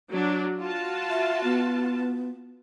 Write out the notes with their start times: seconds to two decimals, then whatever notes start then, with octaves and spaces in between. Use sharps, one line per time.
0.12 F#3 D4
0.60 F4 F#4 A5
1.10 E5
1.44 B3